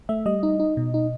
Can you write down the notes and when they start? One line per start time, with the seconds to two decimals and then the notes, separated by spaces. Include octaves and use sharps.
0.09 A3 E5
0.26 G3 D#5
0.43 D#4
0.60 D#4
0.77 B2
0.94 D#4